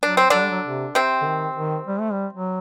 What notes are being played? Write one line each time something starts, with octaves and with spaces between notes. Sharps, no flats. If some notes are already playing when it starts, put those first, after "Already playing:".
F#3 D4
C4
D3 F#3 D4
G3
F#3
C3
C3 C4
D3
D#3
D#3
G3
A3
G3
F#3